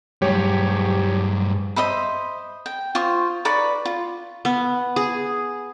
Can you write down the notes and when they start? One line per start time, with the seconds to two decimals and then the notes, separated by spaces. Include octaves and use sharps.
0.22 G2 F#3 A3 G4 G#4 C#5
1.76 C5 D#5 E5 B5
2.66 G5
2.95 F4 C5 C#6 D#6
3.45 D#4 B4 D5 C#6
3.85 F4
4.45 B3
4.96 G#4